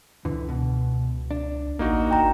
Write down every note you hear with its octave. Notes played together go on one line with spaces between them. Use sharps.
C#2 D3 E3
B2
D4
A1 A#3 D#4 F#4
G1 G5 A#5